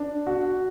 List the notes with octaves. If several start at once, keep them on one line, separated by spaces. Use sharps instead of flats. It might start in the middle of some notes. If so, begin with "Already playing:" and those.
Already playing: D4
F#4